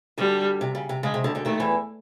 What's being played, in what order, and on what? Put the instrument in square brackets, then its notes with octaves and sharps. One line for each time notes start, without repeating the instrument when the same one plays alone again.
[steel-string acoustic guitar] D2 D3 [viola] G3
[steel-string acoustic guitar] C3
C#3
C3
[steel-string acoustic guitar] C#3 [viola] G#3
[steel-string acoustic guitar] C3
D2 D3
D2 D3
[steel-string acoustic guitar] D#2 D#3 [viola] A3
[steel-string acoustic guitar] E2 E3